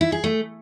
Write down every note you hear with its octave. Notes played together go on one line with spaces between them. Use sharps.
E4
G#4
A3